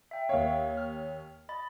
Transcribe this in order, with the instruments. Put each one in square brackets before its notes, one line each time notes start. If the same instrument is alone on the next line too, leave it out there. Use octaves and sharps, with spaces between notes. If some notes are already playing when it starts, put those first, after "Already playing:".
[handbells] E5 G5
[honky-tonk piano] D#2 C#5 [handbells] F5
[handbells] F6
D#5 B5 A6